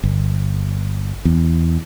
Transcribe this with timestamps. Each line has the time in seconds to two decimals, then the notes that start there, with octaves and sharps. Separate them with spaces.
0.04 G1
1.25 E2